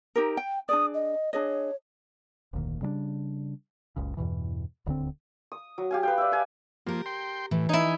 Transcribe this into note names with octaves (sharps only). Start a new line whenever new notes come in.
D#4 G4 A#4
G5
D4 G#4 D5 D#6
D#5
D4 G#4 C#5 D#5
F1 D2 A#2 D#3
C#3 G3 C4 D4
F#1 C#2 C#3
E2 G2 B2 E3
D#1 D2 D3 C4
D#6
F#3
G4 F5 G#5
B4 F5 G5
D5 E5
F5 G#5
F3 A#3 G4 A#4
G5 C6
A2 E3
D#4 E4 G#5